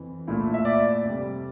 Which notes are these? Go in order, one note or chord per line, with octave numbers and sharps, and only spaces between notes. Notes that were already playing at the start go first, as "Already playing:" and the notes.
Already playing: F2 E3
A#2 A3 E4
E5
D5
F2 C3 G3